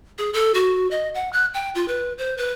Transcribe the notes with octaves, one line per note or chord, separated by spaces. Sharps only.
G#4
A4
F#4
D#5
F#5
F#6
G5
F4
B4
C5
B4